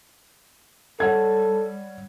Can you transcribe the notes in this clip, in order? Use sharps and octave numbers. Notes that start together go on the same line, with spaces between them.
G3 A4 C#5 F#5 G#6